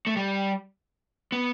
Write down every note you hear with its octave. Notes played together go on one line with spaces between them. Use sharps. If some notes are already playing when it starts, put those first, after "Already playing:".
A3
G3
B3